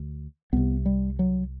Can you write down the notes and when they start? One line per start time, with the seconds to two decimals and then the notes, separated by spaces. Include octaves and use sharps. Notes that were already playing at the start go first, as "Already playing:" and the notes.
Already playing: D2
0.53 C2 C3 B3
0.86 G3
1.19 F#3